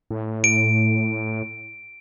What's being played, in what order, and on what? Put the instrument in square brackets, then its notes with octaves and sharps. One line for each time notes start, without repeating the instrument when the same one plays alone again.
[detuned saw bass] A2
[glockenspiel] D7